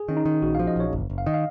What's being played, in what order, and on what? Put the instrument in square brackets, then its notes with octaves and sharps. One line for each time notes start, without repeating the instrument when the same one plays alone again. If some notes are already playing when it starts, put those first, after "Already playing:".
Already playing: [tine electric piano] G#4
[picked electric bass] D#3 [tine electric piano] C#4
[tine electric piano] D#4
[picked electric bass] D#3
[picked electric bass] A#1 [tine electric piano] F#4
[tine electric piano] F5
[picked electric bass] F3
[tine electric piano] D#5
[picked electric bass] A#1 [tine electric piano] C#5
[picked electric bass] F#1
F#1
[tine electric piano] F5
[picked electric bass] D#3 [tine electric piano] D#5
[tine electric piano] F5